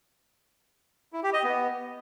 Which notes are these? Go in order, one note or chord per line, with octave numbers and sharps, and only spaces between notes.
E4
G4
D#5
B3